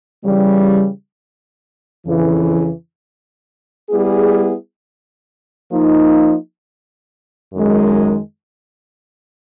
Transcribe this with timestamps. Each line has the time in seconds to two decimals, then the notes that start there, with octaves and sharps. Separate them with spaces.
0.24 C#3 E3 G3
2.07 F2 C#3 E3
3.90 G3 B3 E4 G#4
5.71 F3 A#3 D#4
7.54 F#2 D#3 G#3